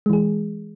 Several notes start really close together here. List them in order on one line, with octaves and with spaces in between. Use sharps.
G#3 E3 G#4